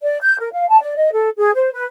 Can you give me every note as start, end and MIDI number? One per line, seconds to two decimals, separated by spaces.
0.01 0.18 74
0.21 0.36 91
0.39 0.51 70
0.52 0.68 77
0.69 0.80 81
0.81 0.95 74
0.97 1.11 75
1.12 1.29 69
1.37 1.51 68
1.55 1.73 72
1.73 1.84 71